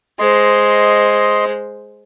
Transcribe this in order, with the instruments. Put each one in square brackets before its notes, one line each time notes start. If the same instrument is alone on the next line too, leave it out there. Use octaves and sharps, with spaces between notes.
[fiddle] G#3 C5 [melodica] D#5 C6